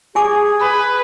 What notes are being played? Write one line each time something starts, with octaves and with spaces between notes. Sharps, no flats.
G4 G#4 G#5 D6
B4 B5